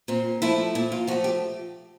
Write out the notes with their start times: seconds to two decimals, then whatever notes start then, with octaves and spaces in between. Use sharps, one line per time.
0.08 A#2 C4
0.42 F3 A3 E4
0.75 A#2 E4
0.92 F4
1.07 F3 F#4
1.11 A3
1.24 G4